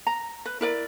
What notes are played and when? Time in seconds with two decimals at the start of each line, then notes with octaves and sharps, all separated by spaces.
0.07 A#5
0.46 B4
0.61 E4 A#4 D5